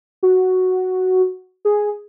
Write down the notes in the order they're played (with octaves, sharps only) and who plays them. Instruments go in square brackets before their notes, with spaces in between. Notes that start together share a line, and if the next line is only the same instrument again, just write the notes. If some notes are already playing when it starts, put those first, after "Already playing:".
[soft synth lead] F#4
G#4